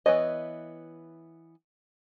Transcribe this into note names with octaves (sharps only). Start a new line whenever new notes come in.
E3 B3 C#5 D#5